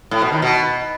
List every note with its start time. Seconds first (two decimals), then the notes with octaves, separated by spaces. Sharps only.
0.11 A2
0.22 B2
0.32 D#3
0.42 B2